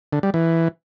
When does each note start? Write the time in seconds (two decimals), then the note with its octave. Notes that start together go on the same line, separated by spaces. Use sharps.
0.13 D3
0.23 G3
0.34 E3